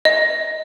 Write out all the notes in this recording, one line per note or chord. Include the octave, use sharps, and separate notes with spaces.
D#5